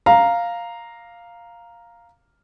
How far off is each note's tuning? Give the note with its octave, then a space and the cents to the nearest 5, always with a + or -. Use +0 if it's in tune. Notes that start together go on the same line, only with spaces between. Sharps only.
F5 +0 A#5 +0